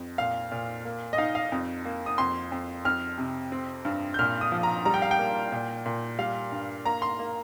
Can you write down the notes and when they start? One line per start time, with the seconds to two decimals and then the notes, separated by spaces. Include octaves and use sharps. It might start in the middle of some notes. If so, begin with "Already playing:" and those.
Already playing: F2
0.18 A#2 F5
0.51 A#2
0.85 A#3
1.13 D#5
1.18 D#4 F5
1.35 F5
1.52 F2
1.85 A#3
2.06 D#6
2.18 F2 C6
2.52 F2
2.85 F2 F6
3.18 C3
3.52 C4
3.85 G2
4.14 G6
4.19 A#2 F6
4.41 D#6
4.52 F3
4.63 A#5
4.85 G3 A#5
4.94 G5
5.02 F5
5.11 G5
5.19 A#3
5.52 A#2
5.86 A#2
6.19 G3 F5
6.52 G2
6.85 A#3 A#5
7.02 C6
7.19 A#3